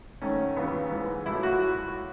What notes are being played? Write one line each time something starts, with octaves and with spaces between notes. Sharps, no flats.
G#2 D#3 A3 C#4
D#2 C#3 E3 B3
G#2 E3 G#3
C#2 B2 A3 E4
F#4